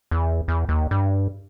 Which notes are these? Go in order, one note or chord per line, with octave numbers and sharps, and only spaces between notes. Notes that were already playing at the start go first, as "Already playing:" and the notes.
E2
E2
D#2
G2